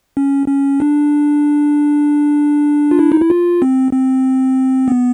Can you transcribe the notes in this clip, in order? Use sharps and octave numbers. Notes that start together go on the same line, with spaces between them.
C#4
C#4
D4
F4
E4
D#4
E4
F4
C4
C4
B3